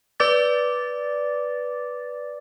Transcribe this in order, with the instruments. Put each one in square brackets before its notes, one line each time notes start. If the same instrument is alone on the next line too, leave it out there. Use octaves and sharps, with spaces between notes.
[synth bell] B4 D5 D6 A6